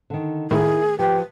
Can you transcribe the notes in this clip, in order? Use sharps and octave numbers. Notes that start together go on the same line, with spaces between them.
D3 D#3
A2 D#3 A#3 E4 G#4
F3 G4 B4